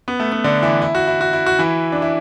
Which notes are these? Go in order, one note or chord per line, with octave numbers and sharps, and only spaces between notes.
B3
A3
B3
D3 D4
E3 E4
E4
F#4
E4
F#4
E4
F#4
E3 E4
D4
E4